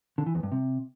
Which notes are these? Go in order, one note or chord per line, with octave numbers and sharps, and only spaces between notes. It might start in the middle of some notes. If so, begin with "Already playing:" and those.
D3
E3
E2
G2
C3